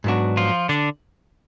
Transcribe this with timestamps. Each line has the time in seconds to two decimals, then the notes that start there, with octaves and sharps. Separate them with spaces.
0.04 G#2 F#3 B3 D4 F#4
0.37 F3 F4
0.69 D3 D4